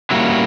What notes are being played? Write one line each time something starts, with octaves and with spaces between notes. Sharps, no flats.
D3 G3 A#3 C#4 E4 F#4